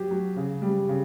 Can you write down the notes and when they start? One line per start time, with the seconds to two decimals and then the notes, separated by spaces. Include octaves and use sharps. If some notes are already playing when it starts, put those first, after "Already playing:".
Already playing: F#3 G4
0.11 F#3
0.36 C#3
0.62 G3
0.88 C#3